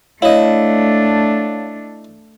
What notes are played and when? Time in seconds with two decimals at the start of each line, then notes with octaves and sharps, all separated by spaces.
0.22 A3 D4 E4 C#5 D#5 F5